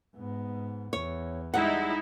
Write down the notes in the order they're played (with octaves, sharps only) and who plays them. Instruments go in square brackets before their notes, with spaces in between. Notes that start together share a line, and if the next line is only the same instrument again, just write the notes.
[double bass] G#2 B3
[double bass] E2 [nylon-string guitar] C#5
[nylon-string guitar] G3 F#5 [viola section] G#3 D#4 E4